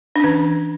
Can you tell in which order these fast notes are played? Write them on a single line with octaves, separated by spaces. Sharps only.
D4 C#4 E3